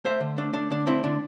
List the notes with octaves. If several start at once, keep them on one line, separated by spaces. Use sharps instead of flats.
A3 C5 E5
D3
A3 D4
A3 D4
D3 D4
A3 C4 E4
D3 D4